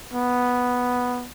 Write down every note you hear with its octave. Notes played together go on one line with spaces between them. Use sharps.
B3